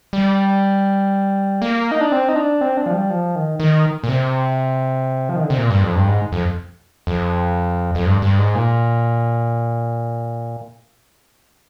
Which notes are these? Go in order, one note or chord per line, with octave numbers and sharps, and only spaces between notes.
G3
A#3
D#4
D4
C4
D#4
D4
C4
D4
F3
G3
F3
D#3
D#3
A#2
C3
F3
D#3
D3
C3
A#2
G2
F2
G2
G#2
F2
F2
F2
G2
G2
G#2
A#2